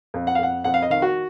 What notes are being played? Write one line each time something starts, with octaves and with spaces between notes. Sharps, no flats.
F2
F#5
F5
F2 F#5
F2 F#5
F5
D#5
D#3 F5
F#4